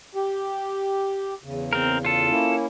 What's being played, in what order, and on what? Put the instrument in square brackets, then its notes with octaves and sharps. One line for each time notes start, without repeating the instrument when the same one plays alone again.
[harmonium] G4
E2 C#3
[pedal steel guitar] C4 A#4
F4 A4
[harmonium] A#3 C#4 E4